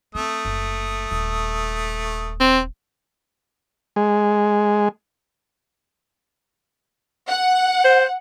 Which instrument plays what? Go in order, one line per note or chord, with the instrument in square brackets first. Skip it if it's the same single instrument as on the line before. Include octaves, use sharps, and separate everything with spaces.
[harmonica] A3 D#6 [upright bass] C4
[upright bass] F#1
D#1
[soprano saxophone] C4
[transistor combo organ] G#3
[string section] F#5
[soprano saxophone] C5